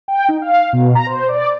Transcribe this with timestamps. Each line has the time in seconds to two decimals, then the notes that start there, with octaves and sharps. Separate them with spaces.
0.08 G5
0.29 D#4
0.42 F5
0.73 B2
0.95 A#5
1.06 C5
1.28 D5